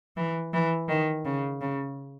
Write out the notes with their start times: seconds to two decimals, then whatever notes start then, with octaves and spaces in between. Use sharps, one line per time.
0.17 E3
0.54 E3
0.89 D#3
1.25 C#3
1.61 C#3